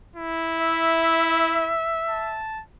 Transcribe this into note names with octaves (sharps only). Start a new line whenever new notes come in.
E4
E5
A5